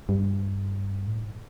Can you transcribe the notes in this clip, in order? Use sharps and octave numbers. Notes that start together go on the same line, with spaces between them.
G2
A2